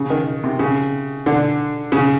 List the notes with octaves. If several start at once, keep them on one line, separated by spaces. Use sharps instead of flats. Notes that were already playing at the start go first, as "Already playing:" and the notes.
Already playing: C#3
D#3
C3
C#3
D3
C#3